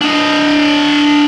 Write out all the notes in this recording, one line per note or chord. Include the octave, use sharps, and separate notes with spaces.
D4 D#5